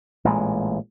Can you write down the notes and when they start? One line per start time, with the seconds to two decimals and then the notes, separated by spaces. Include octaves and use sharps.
0.25 A1 A#2 G#3